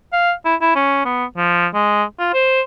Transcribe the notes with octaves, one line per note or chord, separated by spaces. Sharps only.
F5
E4
E4
C#4
B3
F3
G#3
F4
C5